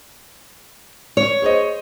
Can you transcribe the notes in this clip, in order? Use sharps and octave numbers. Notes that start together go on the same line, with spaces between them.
C#5
G#4 C5 D#5